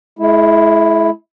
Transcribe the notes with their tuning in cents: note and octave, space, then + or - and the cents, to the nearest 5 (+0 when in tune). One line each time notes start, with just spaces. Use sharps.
G#3 +40 E4 +0